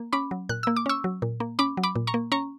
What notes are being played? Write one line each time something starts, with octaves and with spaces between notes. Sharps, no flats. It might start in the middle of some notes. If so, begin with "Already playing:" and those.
Already playing: A#3
C#4 B5 D6
F#3
A#2 F#6
A#3 E6
D6
C#4 C#6 E6
F#3
A#2
A#3
C#4 B5 D6
F#3
B5 D6
A#2
A#5 C#6
A#3
C#4 A#5 C#6